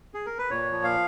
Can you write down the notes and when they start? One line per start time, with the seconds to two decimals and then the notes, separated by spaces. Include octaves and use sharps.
0.14 G#4
0.26 A#4
0.38 B4
0.51 A#2 C#5
0.72 F3
0.84 F5